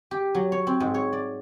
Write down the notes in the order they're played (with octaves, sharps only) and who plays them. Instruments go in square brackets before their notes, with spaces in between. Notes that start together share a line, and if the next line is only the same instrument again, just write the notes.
[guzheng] G4
F#3
C#5
C4
G#2
C#5
D5